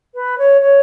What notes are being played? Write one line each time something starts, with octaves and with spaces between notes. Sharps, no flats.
B4
C#5
C#5